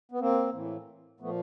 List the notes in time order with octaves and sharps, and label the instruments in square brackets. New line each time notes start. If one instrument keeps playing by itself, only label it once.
[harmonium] B3
A#3 C4
A2 E3
A#2 F3 A3 B3